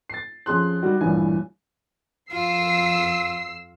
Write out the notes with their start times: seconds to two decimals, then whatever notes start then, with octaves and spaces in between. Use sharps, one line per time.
0.10 A6 C7
0.46 F2 C#4 G#4 C6 F#6
0.82 D#3 G3 F#4
1.01 A1 G2 A#2 E3 G#5
2.32 F2 F4 E6 C7